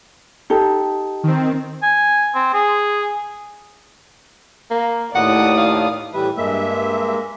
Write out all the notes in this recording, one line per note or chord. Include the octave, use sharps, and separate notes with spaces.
D#4 G4 A4
D#3 C4
G#5
C4
G#4
A#3
D#2 A2 D5 F#5 D#6
F5
A2 E3 G3 B4 E5
G2 G#3 A#3 E5